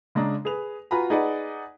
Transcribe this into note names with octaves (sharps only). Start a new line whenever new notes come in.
C#3 G#3 D4 A#5
G#4 B4 F7
F4 F#4 B4 G#5 A#5 B5
D#4 G#4 B4 D5 D#5 F#5